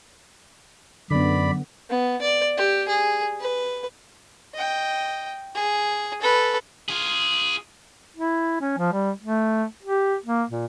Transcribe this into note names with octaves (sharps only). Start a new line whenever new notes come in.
F#2 D3 B3 D5 B5
B3
D5
G4
G#4
B4
D#5 G5
G#4
A4 B4
F4 G#4
E4
C#4
F3
G3
A3
G4
A#3
A#2